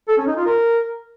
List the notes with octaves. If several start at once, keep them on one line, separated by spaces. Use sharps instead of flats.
A4
C#4
D#4
F4
A#4